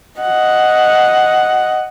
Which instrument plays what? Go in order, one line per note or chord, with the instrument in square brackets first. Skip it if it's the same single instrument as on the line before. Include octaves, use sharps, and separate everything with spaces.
[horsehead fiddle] D#5 F#5